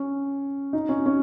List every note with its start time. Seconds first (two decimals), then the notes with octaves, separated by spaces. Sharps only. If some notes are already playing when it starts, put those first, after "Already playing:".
Already playing: C#4
0.73 D#4
0.89 C#4
1.06 C#4